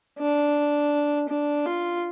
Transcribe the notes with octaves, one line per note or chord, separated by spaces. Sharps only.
D4
D4
F4